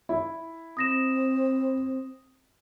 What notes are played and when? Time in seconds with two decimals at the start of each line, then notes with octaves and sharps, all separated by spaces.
0.09 E4
0.77 C4 D#6 A#6 E7